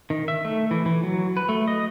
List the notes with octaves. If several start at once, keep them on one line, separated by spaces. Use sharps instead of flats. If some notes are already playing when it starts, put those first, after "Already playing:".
D#3
E5
A3
E3
E3
F#3
B4
A3
D#5